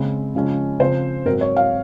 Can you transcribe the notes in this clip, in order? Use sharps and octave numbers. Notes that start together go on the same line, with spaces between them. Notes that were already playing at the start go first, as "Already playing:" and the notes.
Already playing: C#3 G#3 C4
C#3 F3 G#3 C#4
C#3 F3 C4 C5
G#2 F#3 C4 A#4
C#5
F5